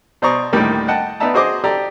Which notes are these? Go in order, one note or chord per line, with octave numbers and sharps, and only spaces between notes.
B2 C5 D5 A#5 C#6 D#6
D2 A2 D#3 G3 A#3
D#5 F#5 G5 A5
B3 D#4 D5 E5 A5 A#5
F#4 G#4 C5 D#5 D6
G4 A4 D5 A#5